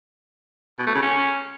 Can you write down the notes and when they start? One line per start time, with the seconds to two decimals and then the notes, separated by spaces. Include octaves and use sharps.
0.79 B2
0.87 A3
0.94 C#3
1.02 C#4